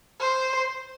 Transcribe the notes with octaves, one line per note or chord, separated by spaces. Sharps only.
C5